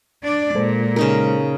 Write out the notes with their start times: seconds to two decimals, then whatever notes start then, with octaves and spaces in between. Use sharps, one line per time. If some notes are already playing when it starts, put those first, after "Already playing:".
0.23 D4 D5
0.55 A#2 G#3 A4 C5
0.96 C#3 D#4 A#4